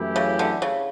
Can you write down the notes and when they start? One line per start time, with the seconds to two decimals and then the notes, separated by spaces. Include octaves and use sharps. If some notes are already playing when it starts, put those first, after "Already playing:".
Already playing: F#2 E3 A3 E4 G4
0.16 C#3
0.39 D3
0.62 C#3